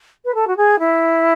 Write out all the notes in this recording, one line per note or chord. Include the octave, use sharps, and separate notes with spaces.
B4
A4
F#4
G#4
E4